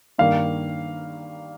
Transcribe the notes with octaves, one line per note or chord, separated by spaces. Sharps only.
G2 D#3 A#3 F5